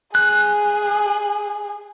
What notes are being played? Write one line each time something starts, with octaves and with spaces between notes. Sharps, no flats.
G#4 F#6